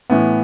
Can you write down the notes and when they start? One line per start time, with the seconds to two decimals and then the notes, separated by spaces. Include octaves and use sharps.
0.10 A2 E3 B3